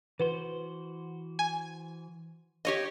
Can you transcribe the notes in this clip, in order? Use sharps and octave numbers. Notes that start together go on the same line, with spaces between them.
E3 F#4 B4 C5
G#5
G4 C#5 D#5